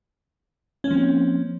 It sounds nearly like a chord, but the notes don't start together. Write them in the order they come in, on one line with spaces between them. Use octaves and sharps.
C#4 A#3 F3 C4